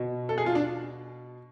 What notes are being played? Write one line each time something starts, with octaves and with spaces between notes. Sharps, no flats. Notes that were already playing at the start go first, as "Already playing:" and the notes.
Already playing: B2
A4
G#4
F4
D4